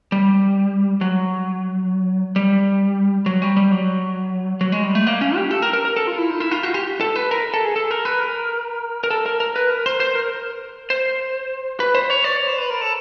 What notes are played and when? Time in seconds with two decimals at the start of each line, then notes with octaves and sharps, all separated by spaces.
0.12 G3
1.01 F#3
2.36 G3
3.26 F#3
3.42 G3
3.57 G3
3.72 F#3
4.61 F#3
4.72 G#3
4.84 G3
4.95 A3
5.07 A#3
5.21 C#4
5.36 G4
5.51 A4
5.62 A#4
5.73 A#4
5.85 A#4
5.97 A4
6.07 F4
6.18 E4
6.30 D#4
6.40 E4
6.51 F4
6.63 F#4
6.74 G4
7.01 A4
7.16 B4
7.31 A#4
7.54 A4
7.65 G#4
7.76 A4
7.91 A#4
8.05 B4
8.20 A#4
9.04 A#4
9.11 A4
9.26 A#4
9.40 A#4
9.56 B4
9.70 A#4
9.86 C5
10.00 C5
10.15 A#4
10.90 C5
11.80 B4
11.95 C5
12.10 C#5
12.24 D5
12.37 C#5
12.47 C5
12.58 B4
12.70 A#4
12.81 A4